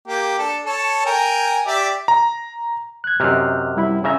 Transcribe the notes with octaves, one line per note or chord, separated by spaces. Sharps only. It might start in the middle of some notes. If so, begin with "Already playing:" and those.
A#3 G4
D4 A4
A4 C#5 A5
A#4 G5 G#5
G4 D5 E5
A#5
F#6 G#6
F#2 C3 D#5 F6 F#6
G3 E4 B5
C#3 C#4 E5 G#5 A#5